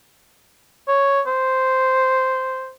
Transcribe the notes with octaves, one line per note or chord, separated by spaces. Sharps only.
C#5
C5